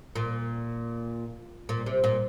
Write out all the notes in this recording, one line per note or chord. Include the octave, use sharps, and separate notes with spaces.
A#2
A#2
C3
A#2